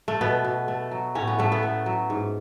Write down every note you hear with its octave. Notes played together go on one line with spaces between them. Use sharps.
A3
B2 B3
B2
A3
F#3
A2 C#4
B3
A2 A3
B3
A3
F#3
G#2